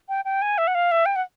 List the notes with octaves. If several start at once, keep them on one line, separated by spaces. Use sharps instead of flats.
G5
G5
G#5
E5
F#5
F5
E5
G5
F#5